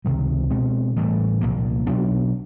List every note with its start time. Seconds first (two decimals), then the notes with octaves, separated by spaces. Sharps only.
0.05 C#2 C3 D#3 G3
0.50 B2 G#3 C4
0.96 A2 E3 G3
1.41 C2 A#2 F3 A#3
1.87 B2 F#3 B3 D4